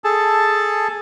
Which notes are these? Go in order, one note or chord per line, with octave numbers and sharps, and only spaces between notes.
G#4 A4 A5